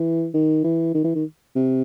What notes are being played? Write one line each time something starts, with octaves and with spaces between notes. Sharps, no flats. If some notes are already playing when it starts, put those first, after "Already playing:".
Already playing: E3
D#3
E3
D#3
E3
D#3
C3